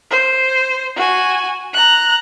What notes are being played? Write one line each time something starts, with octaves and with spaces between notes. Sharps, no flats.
C5
F#4 G#5
A#5 F#6